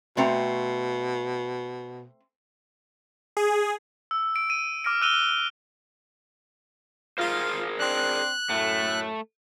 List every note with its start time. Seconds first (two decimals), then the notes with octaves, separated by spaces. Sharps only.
0.17 B2 A3 C4 A#5
3.37 G#4
4.11 E6
4.36 D7
4.50 D#7
4.84 D6 F6 A#6 D7
5.01 E6 F#6 D#7 F7 G7
7.18 F4 G#4 A#4 C5
7.80 C4 D4 F#6
8.50 F#2 A2 A3